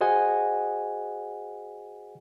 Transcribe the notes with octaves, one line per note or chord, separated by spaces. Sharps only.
F#4 G#4 C5 D#5 F#5 G#5